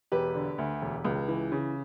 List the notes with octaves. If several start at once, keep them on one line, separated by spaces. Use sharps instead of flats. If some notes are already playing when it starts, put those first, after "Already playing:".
E1 G4 B4
D3
D2
E1
C#2
E3
C#3